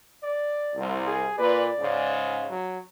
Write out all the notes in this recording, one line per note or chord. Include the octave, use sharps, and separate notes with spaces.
D5
C2
G#4
A#2 B4 D5
G#2 C#3
F#3